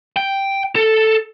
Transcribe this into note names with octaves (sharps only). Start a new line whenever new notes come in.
G5
A4